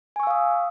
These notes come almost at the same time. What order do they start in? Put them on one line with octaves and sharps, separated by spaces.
G#5 C#6 E6 F5 D#6